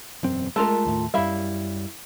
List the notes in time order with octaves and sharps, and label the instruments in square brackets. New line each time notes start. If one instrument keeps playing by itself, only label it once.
[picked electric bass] E1 F#2 C4
[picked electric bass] G#3 [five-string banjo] A3 F4 A#4
[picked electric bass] D#2 A2
[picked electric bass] F#2 G3 [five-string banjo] E4 E5 F5